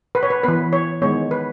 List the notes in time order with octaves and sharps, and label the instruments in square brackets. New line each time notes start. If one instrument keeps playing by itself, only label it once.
[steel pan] B4
C#5
B4
E3 B3 B4
C#5
D#3 G#3 B3 C#5
B4